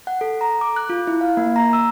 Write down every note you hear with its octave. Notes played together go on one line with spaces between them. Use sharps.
F#5
A4
A#5
D6
F#6
F4
E4
F5
A#3
A#5
E6